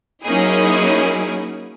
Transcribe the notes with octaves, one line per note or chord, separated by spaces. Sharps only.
F#3 A#3 C#4 D#4 E4 G#4